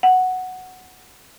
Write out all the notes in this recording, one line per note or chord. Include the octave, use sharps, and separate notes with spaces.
F#5